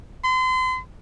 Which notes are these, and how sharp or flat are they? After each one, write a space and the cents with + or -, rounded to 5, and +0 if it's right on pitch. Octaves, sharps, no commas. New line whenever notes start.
C6 -35